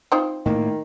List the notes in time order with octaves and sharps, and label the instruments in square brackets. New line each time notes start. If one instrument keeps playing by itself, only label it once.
[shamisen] C4 D#4 F4
[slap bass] A2 A#3 [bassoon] D#3